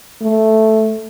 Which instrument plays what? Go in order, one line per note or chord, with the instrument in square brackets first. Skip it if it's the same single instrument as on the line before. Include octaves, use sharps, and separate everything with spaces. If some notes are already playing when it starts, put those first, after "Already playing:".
[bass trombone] A3